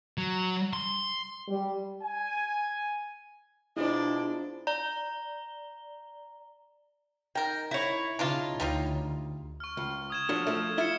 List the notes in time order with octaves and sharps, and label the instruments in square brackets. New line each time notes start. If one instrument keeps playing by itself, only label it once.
[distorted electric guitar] F#3
C6
[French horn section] G3
[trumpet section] G#5
[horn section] B2 G#3 D5 [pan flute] D4 [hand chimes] E4 F4 C5
[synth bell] D5 G7 [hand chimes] A#5
[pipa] D#3 A#4 [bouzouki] G5
[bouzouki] E4 C#5
[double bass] C#3 [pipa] D4 D#4 F4
[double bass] D2 [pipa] G3 D#4 F4
[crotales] C#6 F6
[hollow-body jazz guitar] C#2
[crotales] D#6 G#6 E7
[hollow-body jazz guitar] F3 F#3 D4
F3 A3
[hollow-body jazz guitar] E4 F4 E5 [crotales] C#7 E7 G7